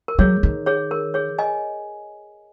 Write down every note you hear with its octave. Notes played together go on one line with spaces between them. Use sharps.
A#4
F#3 G#4 C#5
D#3
G#4 C#5
A#4
G#4 C#5
D#5 G#5